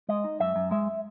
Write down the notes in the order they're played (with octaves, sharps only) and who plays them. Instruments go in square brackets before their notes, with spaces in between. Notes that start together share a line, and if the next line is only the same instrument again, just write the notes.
[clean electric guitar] G#3 D#5
D#4
F#2 E5
F#2
G#3 E5